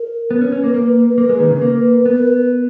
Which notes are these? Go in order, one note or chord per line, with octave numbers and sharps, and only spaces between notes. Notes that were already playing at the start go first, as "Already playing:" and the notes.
Already playing: A#4
B3 B4
C#4
C#4
A#3
A#3
A#3
G#3
D#3
C#3
A#3
B3 A#4
B4